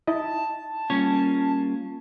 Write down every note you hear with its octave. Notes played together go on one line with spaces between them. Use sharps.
D#4 E4 D#5 A5
G3 A#3 C#4 F4 C#5